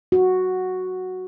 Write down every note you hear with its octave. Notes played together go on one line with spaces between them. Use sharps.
F#4